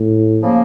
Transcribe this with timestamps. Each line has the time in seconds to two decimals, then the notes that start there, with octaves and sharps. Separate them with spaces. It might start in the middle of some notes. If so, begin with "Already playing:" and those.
Already playing: A2
0.41 C#3 F3 A#3